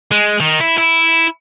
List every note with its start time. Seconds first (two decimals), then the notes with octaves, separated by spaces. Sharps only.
0.11 G#3
0.40 D#3
0.60 E4
0.78 E4